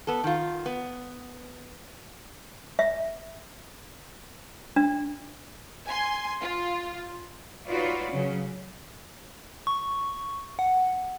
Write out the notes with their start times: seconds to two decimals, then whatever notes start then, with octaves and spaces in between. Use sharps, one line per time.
0.07 B3 A4
0.24 D#3 F4
0.66 B3
2.79 E5
4.76 D4
5.87 G#5 C6
6.41 F4
7.67 D#4 F4 F#4 B4 C#5 D5
8.11 C#3 F#3 C#4
9.67 C#6
10.59 F#5